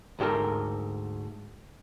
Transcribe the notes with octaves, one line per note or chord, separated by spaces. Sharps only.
D2 G#2 G4 A4 A#4